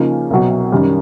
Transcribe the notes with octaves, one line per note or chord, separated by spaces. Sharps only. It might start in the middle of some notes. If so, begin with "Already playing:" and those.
Already playing: C#3 F3 A#3 D#4
C2 B2 F#3
F#2 D#3 G3